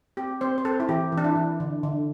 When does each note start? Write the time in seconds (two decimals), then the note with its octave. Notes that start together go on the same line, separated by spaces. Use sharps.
0.17 C4 G4
0.41 C4 C5
0.58 C5
0.65 C4 A4
0.80 E4
0.89 E3 G4
1.12 E3
1.18 D4
1.24 E4
1.36 E3
1.60 D3
1.83 D3